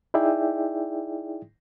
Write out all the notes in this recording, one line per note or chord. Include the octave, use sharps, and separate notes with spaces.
D#4 E4 G#4 D5 E5 G5